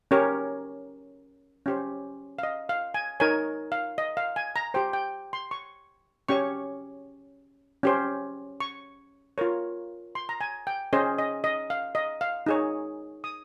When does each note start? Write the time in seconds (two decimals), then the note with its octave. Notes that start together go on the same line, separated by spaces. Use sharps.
0.11 C#4 G4 A#4 C#5
1.66 C#4 G4 C5
2.39 F5
2.43 D#5
2.69 F5
2.94 G#5
3.20 D#4 A#4 C#5 G#5
3.72 F5
3.98 D#5
4.17 F5
4.36 G#5
4.56 A#5
4.74 G4 C5 G5
4.93 G5
5.33 C6
5.51 C#6
6.29 C#4 G4 C#5 C#6
7.83 C#4 G4 C5
8.60 C#6
9.38 F4 A#4 C#5
10.15 C6
10.29 A#5
10.41 G#5
10.67 G5
10.93 C#4 G#4 C5 D#5
11.19 D#5
11.44 D#5
11.70 F5
11.95 D#5
12.21 F5
12.46 D#4 G#4 C#5
13.24 D#6